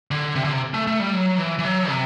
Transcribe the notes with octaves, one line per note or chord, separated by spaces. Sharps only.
D3
C3
D3
C3
A3
A3
G3
F#3
E3
E3
F#3
C3